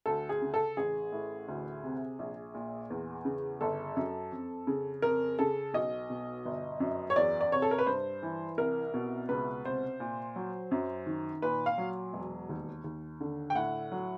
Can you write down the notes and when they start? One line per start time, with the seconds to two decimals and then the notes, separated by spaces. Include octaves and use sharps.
0.06 D2 A4
0.29 G#4
0.42 C#3
0.54 A4
0.77 A1 G#4
1.12 A2
1.48 D2
1.84 C3
2.19 A#1
2.55 A#2
2.90 E2
3.25 C#3
3.61 G1 A4
3.96 F#2
4.32 F2
4.67 C#3
5.02 F2 A#4
5.39 C#3 A4
5.74 B1 D#5
6.10 B2
6.45 G1
6.80 F#2
7.10 C#5
7.16 E2 D5
7.41 D5
7.52 C3 C#5
7.62 A4
7.71 A#4
7.78 B4
7.87 G2 C5
8.23 E3
8.58 C2 A#4
8.94 B2
9.29 C#2 B4
9.64 C3 C5
10.00 A#2
10.36 F#3
10.71 F#2
11.06 D#3
11.42 A#2 B4
11.66 F5
11.78 F#3
12.13 E1
12.49 D#2
12.84 D#2
13.21 D3
13.50 G5
13.55 A2 F#5
13.92 F#3